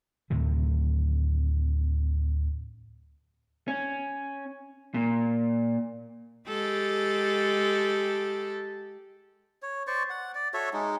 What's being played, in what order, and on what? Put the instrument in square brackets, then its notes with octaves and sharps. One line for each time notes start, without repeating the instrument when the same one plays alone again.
[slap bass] D2 A2 C3 D#3
[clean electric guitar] C#4
A#2
[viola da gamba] G#3 G4 A4
[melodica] C#5
C5 D5 C#6
F#5
D5
F#4 A4 C#5 E5
G#3 D#4